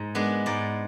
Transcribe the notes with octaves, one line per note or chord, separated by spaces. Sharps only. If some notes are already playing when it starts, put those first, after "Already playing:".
Already playing: G#2
G#3 B3 D4
G#2 D5